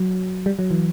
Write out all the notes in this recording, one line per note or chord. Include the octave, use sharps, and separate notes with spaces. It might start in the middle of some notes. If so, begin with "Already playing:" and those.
Already playing: F#3
G3
F#3
E3